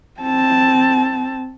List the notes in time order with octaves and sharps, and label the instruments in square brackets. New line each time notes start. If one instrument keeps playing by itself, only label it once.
[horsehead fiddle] C4 A5